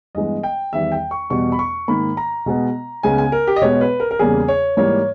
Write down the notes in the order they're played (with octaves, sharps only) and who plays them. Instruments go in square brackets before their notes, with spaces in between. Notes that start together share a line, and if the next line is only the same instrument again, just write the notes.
[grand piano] G2 E3 G#3 B3 D#5
G5
E2 D#3 G3 B3 E5
G5
C#6
E2 B2 G3 B3 C#6
B5
C#6
G#2 D#3 A#3 B5
A#5
B2 G#3 B3
C#2 C#3 G#3 B3 G#5
G#5
A#4
G4
D#5
B2 G#3 B3 C#5
B4
A#4
A#4
E2 C#3 G3 A#3 G#4
C#5
G#2 E3 G3 A#3 C#5